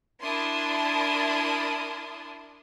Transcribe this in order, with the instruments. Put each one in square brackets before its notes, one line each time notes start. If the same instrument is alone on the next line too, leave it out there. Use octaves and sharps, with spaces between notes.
[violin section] D4 E4 A#4 A5 C6 D#6